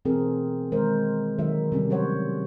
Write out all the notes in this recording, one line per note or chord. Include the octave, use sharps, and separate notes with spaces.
B2 E3 A3 C4 G#4 A#4
D#3 G#3 A#4 C5
D3 D#3 F#3 D#4 F#4 E5
C3 G3 C#4
F#3 C5 C#5 F#5